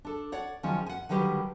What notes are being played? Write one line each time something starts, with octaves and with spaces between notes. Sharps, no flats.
D4 A4
C#5 D5 F#5
D#3 F3 F#3 G#3 C#4
F#5 G#5
D3 D#3 F#3 G3 G4 B4